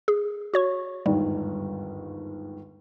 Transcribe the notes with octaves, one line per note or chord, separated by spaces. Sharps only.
G#4
F#4 C#5 C#6
G1 D#2 G#2 G3